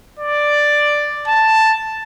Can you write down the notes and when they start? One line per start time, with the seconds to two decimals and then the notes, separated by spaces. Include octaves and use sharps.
0.19 D5
1.28 A5